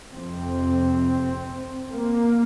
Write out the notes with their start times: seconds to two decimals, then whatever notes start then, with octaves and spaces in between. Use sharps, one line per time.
0.13 F2 C3 C4
1.94 A#3